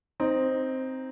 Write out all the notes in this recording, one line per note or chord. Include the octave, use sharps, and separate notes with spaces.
C4 D#4